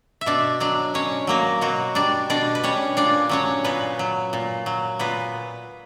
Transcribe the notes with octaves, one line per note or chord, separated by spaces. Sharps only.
E5
B2 D4 D5
F#3 D4 D5
B2 C#4 C#5
F#3 A#3 A#4
B2 F#3 F#4
G3 D4 D5
B2 D4 D5
B4
G3 C#4 C#5
A#2 D4 D5
F#3 C#4 C#5
A#2 B3 B4
F#3
A#2
F#3
A#2 B3 B4